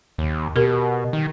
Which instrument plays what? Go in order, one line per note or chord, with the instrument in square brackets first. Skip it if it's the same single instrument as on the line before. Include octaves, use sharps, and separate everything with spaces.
[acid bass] D#2
[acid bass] B2 [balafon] G4 A#4
[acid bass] D#3